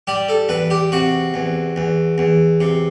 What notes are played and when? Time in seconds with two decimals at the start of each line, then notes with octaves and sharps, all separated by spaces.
0.07 G3 G4
0.29 A4
0.49 E2 B4
0.70 G4
0.92 C3 F#4
1.34 E2
1.76 E2
2.18 E2
2.61 C3